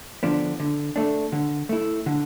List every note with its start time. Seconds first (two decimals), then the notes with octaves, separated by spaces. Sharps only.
0.23 D3 F3 B3 D4
0.60 D3
0.96 A3 D4
1.32 D3
1.69 A3 E4
2.06 D3